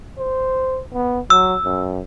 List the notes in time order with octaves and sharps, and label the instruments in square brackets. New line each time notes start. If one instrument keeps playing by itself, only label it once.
[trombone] C5
B3
[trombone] F#3 [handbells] E6
[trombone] F#2